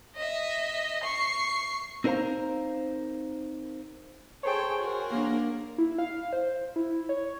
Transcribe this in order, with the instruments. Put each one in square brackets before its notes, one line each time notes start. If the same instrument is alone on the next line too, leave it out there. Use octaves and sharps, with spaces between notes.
[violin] D#5 E5
C#6 C7
[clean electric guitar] C4 D#4 A#4 C5 F5 A#5
[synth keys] G#4 C5 C#5 [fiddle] A4 G5
[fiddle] F#4 A#4
[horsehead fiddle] A#3 D4
[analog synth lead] E4
F5
C5
E4
C#5